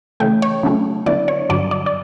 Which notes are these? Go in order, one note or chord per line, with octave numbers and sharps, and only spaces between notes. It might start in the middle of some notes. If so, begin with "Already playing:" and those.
C#3 E3 A3 G5
C#5
C#3 F#3 A3 C#4
D3 F#3 B3 E4 D5
C#5
G2 D3 F#3 D5
D5
D5